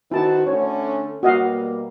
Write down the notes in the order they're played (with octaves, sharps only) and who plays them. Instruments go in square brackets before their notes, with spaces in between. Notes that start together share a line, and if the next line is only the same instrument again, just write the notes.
[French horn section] D#3 F#4 C5 [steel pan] E4 A5
[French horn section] D3 A3 C#4 [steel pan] C#5
[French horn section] B2 G3 A#3 [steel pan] F#4 D#5 F5